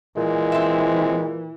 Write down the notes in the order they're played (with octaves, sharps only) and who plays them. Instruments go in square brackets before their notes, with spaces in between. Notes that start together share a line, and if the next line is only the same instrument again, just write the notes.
[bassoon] A#2 [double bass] E3 [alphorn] G#3
[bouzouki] C4 E5